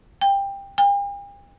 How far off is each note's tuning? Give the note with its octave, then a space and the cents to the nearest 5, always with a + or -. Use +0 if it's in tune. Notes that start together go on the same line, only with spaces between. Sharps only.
G5 +15
G5 +45